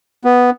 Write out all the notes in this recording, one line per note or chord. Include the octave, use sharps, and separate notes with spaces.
B3